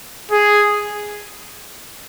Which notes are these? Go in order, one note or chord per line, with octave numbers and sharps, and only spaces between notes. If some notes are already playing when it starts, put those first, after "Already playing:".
G#4